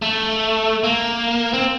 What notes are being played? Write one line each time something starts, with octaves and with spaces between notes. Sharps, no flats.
A3
A#3
C4